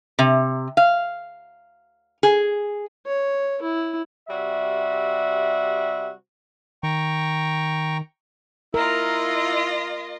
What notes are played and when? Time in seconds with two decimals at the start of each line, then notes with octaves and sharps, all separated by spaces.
0.19 C3
0.77 F5
2.23 G#4
3.07 C#5
3.62 E4
4.29 C3 G3 F#4 E5
6.83 D#3 G5 A#5 C#6
8.74 E4 F4 A#4 D#5